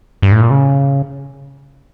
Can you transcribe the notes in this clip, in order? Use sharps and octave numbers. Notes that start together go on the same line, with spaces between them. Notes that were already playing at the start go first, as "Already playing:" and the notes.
G2
A2
A#2
C#3